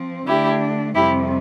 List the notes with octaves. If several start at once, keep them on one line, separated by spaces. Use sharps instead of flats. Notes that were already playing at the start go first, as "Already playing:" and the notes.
Already playing: F3 C4
D3 A3 D4 E4 G4
F2 C3 G3 E4 G4